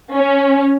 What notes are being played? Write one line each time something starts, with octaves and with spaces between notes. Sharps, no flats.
C#4